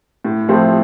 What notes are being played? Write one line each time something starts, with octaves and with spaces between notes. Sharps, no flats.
A2
F3 A3 C4 E4